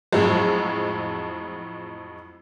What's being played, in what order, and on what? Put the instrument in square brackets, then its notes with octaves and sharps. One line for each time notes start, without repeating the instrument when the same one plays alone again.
[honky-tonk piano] F2 A2 F3 F#3 G#3